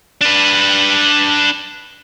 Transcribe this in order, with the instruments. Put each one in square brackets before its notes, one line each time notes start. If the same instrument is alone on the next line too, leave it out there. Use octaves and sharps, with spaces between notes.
[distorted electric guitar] D4 B4